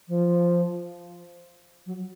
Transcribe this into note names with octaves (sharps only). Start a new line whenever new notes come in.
F3
F#3